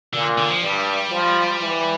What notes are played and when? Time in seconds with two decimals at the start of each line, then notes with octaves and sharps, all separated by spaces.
0.14 A#2 D3
0.38 D3
0.50 F3
0.62 G2 G3
1.12 F3
1.61 E3